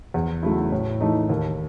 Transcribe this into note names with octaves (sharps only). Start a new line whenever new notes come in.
E2
C#3 F#3 A3 E4
A2
E3 A3 D#4
D#2